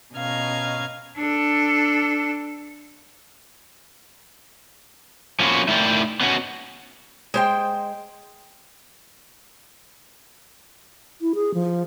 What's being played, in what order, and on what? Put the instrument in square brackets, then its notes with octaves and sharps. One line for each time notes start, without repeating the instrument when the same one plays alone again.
[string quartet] B2 C#4 D#5 F5 A#5 G#6
[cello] D4 A4
[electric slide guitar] F3 A#3 B3 C#4 F4 F#4
A3 D#4 E4 A#4 D5 G5
B3 C#4 F#4
[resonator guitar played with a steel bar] G#3 C5 G5
[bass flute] E4
G#4
F3